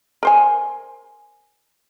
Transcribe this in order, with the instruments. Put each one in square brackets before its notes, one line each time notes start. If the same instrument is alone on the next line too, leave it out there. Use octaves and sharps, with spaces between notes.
[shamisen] A#4 C5 G#5